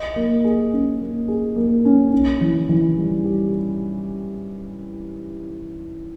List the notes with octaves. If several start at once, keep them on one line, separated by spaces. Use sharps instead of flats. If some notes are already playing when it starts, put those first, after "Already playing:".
Already playing: D#5
A#3
G#4
C#4
A#3
G#4
A#3
C#4
C#4
E3
E3
G3
G4